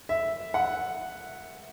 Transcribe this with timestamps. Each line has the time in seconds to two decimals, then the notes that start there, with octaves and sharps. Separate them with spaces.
0.09 E5
0.54 F#5